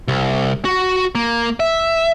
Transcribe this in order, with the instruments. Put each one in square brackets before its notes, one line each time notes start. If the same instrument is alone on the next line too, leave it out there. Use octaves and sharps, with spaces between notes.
[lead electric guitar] C2
F#4
A#3
E5